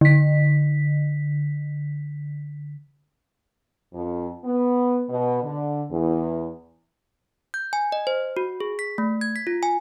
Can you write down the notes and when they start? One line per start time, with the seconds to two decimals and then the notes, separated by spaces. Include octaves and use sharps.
0.01 D3 B6
3.93 F2
4.44 B3
5.09 B2
5.42 D3
5.90 E2
7.54 G6
7.73 G#5
7.92 D#5
8.07 C5
8.37 F#4
8.60 G#4
8.79 B6
8.98 A3
9.21 G#6
9.36 B6
9.47 F4
9.63 G#5